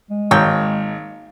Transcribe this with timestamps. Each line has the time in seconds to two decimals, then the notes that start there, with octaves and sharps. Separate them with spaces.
0.10 G#3
0.31 G#1 A#3 C#5 G5